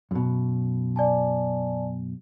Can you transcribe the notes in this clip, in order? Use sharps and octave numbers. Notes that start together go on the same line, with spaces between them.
F#2 B2
D5 G#5 A5